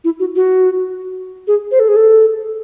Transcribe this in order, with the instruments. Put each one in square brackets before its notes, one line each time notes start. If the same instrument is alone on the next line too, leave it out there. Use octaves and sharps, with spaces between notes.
[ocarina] E4
F#4
F#4
G#4
C5
A4
G#4
A4